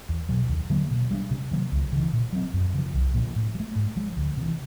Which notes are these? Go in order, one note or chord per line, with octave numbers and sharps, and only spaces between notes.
E2
B2 F#3
D#2
D3 F#3 A#3
B2
G3 A#3 D4
C3
D#3 F#3 A#3
C#2
C#3 E3
A#2
F#3 A3 C4
F#2
C#3 F3
C2
A#2 F3
A2
F#3
A3
G#2
F3 G#3
D2
C3 E3